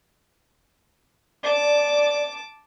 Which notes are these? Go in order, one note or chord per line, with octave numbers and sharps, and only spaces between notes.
D5 A5 D6